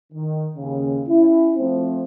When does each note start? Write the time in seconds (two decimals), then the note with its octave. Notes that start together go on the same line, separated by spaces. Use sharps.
0.13 D#3
0.56 D#2 C#3
1.08 C#4 E4
1.57 F3 A3 C4